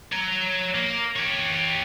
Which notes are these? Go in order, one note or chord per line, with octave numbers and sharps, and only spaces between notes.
C#5 A#5
A#3
G4 C#5